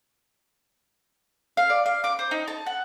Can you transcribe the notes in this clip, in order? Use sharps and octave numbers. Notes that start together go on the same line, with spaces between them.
F5
D5
F5
D6
C5
D#4
A5
F#5